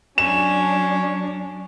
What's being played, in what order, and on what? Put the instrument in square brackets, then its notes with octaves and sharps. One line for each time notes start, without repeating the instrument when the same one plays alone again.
[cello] F#3 D4 [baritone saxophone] C#4 [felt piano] E7